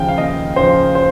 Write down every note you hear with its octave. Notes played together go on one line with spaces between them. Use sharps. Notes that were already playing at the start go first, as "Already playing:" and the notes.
Already playing: D#2 C#3 F3 G5
F5
D#2 D#5
C#3 F3 C5
C5